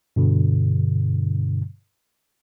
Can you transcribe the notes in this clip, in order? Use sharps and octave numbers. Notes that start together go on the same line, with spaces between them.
G2 B2 D3